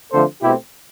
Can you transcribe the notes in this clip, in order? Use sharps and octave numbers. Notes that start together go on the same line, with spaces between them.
D3 F3 A3 C4 A4 C5
B2 A3 C4 E4 G4